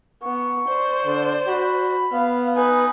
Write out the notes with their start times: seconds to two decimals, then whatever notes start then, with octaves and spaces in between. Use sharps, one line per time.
0.23 B3 C#6
0.68 C5 D5
1.05 D3
1.47 F#4 B5
2.12 B3 F5
2.56 D#4 B4 G#5